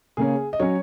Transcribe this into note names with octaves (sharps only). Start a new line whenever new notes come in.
C#3 A#3 C#4 G#4
D#5
F#3 C#4 C#5